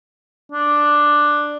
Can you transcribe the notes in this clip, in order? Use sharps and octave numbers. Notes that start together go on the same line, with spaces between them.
D4